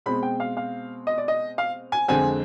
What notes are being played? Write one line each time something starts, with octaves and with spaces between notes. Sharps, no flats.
B2 G#3 C4 B5
G5
F5
F5
D#5
D5
D#5
F5
G#5
F2 D3 G#3 C4 G#5